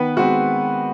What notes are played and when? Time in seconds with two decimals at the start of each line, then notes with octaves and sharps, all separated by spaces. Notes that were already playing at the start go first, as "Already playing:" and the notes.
Already playing: D#3 B3 B4
0.17 G#3 C4 F#4